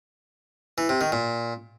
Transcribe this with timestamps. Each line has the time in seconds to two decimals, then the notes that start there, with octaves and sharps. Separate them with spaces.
0.78 E3
0.89 C3
1.01 D#3
1.12 A#2